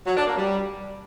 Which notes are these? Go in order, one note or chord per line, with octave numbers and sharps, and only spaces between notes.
F#3
D4
A#3
G3